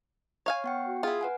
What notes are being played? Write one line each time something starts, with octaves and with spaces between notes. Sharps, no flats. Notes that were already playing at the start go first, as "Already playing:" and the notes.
C#5 F5 G#5
B3 F#5 G5
F#4
E4 F4 G#4
B4 F#5 G#5